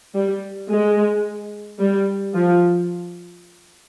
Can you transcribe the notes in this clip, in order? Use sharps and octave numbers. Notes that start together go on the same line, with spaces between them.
G3
G#3
G3
F3